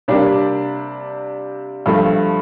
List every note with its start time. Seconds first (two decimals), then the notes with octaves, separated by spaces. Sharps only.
0.08 C3 G3 A#3 D4
1.86 G2 F3 A3